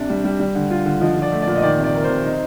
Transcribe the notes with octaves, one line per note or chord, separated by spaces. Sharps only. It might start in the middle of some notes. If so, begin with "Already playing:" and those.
Already playing: C3 D4
G3
G3
G3
D3
F4
D3
F3 D#5
F3
D5
A3
D5
A#2
D#5
D#3 D5
C3
D5
D#3 A#4
C5
C3
D#4